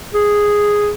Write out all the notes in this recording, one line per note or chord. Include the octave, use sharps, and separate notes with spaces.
G#4